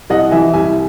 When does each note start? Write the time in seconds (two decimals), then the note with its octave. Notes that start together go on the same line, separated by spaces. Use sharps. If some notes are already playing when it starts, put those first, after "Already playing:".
0.10 C2 D#5 F#5
0.31 E3 E5 G#5
0.54 C2 E5 G#5